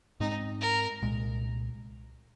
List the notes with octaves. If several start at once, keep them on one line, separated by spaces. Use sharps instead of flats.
G#2 G#3 C4 D#4
A#4
C2 A#2 G#3